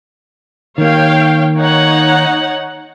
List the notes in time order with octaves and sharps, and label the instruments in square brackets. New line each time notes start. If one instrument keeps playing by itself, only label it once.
[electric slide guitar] D#3 A#3 [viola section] C#5 F5 G5
[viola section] D#4 C#5 F#5